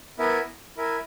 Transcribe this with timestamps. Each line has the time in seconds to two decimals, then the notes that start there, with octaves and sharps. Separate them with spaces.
0.18 B3 E4 A#4 E5 G#5
0.77 E4 A#4 E5 G#5